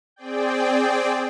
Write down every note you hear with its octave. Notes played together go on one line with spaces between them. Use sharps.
C4 G#4 D5 G5